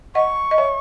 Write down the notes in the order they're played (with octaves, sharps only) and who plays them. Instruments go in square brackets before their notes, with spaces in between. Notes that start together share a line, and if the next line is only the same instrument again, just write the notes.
[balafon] D#5 F#5 [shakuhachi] C#6
[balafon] D#5
C#5 E5